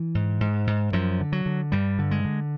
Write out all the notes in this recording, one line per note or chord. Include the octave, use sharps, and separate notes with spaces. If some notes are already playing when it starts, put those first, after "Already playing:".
Already playing: E3
G#2
G#2
G#2
F#2 F3
D3
F#3
D3
G2 G3
D3
G#3
D3